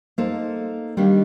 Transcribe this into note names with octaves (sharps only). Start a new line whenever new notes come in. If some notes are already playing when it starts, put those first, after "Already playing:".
A#3 D#4 A4 C5
D#3 G3 A#3 D4 G4